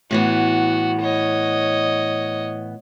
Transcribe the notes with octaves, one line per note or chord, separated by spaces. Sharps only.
A2 E3 B3 F#4
C#5 D#5